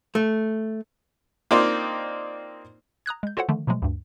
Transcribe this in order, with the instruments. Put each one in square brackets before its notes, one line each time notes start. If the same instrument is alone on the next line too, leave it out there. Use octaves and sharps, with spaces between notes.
[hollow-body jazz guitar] A3
[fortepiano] A#3 C4 D4 D#4 F4
[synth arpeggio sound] A#5 D#6 F#6 G#6
G#3 G6
F4 F#4 A4 C5 C#5 F#5
D3 D#3 F3 A3
B2 F3 F#3 G#3 A3
D2 G2